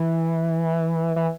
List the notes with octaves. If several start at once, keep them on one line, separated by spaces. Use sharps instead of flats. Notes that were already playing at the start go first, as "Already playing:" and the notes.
Already playing: E3
E3